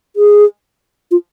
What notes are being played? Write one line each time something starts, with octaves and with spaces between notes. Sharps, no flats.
G#4
F4